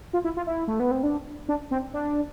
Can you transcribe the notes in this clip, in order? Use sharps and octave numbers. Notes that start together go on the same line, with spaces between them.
F4
E4
F4
E4
A3
B3
C4
D4
D4
C4
D4